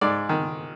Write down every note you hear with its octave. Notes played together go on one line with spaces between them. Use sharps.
G#2 D5
D#3